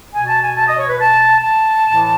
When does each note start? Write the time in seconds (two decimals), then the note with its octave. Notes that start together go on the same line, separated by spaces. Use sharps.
0.13 B2 G#5
0.27 A5
0.42 G#5
0.56 A5
0.67 D#5
0.78 C#5
0.88 B4
1.00 A5
1.42 A5
1.85 A2 E3